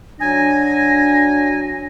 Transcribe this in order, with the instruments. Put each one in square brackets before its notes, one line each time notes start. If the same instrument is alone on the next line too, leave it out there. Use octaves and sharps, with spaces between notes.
[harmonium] F#3 [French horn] D4 [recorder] G#5 [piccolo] A#6